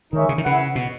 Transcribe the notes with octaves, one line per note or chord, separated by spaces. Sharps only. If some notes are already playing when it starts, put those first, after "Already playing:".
D#3 G#3 D#4 A#4 C#5 E5
C#3
D#3
C#3 E4 B4 F#5
B2